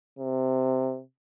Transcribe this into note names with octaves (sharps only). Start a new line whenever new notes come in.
C3